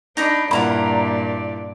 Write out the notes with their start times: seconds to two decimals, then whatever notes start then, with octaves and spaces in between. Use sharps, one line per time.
0.17 D4 D#4 D#5 B5
0.51 G2 A#2 E4 D5 F5 F#5 A#5